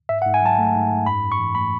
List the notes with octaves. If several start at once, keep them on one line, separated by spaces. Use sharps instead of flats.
G#2 E5
F#5
G#2
G#5
F#3 A5
A3
G#2
G#2
F#2 B5
F#2
C#6
E3
A3 B5